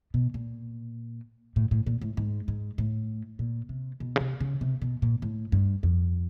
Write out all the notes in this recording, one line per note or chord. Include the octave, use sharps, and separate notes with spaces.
B2
A#2
A2
A2
A#2
A2
G#2
G#2
A2
A#2
C3
B2
C#3
C3
C#3
C3
B2
A#2
A2
G2
F2